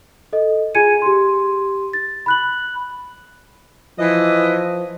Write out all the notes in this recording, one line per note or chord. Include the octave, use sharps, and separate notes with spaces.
A4 D#5
F4 G#4 G#5 G#6 C#7 D#7
G4 C6
A6
B5 F#6 F#7
E3 F3 D#5